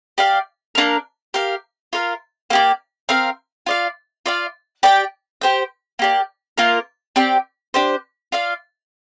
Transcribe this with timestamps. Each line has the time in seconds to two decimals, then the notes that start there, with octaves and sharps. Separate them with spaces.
0.18 G4 D5 F5
0.75 A#3 D4 A#4
1.34 G4 A#4 F5
1.93 F4 A#4 F5
2.50 A#3 G4 D5
3.09 C4 A#4 F5
3.66 F4 D5 F5
4.26 F4 D5 F5
4.83 G4 D5 G5
5.41 G4 C5 G5
5.99 A#3 G4 D5
6.58 A#3 F4 A#4
7.16 C4 G4 D5 G5
7.74 D4 G4 C5
8.32 F4 D5 F5